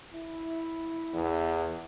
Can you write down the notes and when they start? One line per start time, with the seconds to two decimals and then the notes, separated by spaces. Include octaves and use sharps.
0.14 E4
1.13 E2